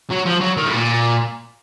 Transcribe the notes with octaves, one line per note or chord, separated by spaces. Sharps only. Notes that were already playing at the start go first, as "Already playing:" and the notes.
F#3
F3
F#3
D#3
A2
A#2